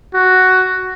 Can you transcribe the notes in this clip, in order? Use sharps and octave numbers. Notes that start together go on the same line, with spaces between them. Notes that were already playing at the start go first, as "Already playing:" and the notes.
F#4